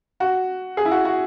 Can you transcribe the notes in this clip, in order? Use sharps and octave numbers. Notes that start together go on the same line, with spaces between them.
F#4
G#4
E4
F#4
F#4